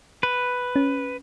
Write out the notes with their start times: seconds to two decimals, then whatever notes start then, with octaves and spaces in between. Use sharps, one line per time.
0.23 B4
0.76 C#4